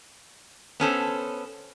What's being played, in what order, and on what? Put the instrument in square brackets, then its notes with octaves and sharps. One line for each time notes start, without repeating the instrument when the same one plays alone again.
[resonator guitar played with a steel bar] B3 C#4 A4 C5